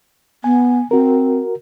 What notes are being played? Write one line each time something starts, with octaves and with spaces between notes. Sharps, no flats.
B3 G#5
C4 F#4 A#4